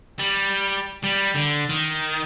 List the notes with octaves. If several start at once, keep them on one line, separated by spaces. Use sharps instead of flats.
G3
G3
D3
D#3